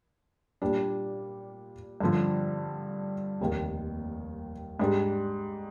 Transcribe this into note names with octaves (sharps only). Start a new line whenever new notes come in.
A#2 G3 D4
G2 D3 F3
F1 D#2 D#3
G#2 G3 D4